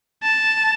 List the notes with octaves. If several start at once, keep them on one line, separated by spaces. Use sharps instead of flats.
A5